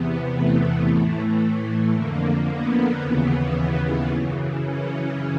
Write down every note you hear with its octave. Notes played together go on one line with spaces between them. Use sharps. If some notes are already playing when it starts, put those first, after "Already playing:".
Already playing: E2 C3 E3 B3
A3
A2 E3
F2 D3 A#3
B3
D#2 C#3 E3
F#2 C#3 E3
C#4